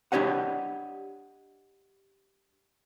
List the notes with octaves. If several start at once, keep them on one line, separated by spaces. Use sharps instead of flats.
D4 G4 C#5 D#5 F#5